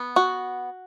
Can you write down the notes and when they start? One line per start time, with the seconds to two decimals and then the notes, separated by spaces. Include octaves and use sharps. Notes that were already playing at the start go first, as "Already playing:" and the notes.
Already playing: B3
0.16 F#4